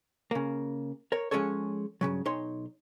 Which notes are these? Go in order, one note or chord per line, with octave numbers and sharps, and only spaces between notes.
C#3 A#3
A#4 C#5
F3 G#3 C#4 G#4 A4 C#5
G2 A#2 C#3 F#3
B1 D#4 C#5 C6